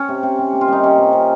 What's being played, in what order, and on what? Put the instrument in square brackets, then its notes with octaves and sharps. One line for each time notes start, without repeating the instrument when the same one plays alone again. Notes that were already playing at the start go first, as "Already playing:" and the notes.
Already playing: [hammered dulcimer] C#4
C3
C3
C3
A#3
F4
G3 D#4
C3 C#4
C3
C3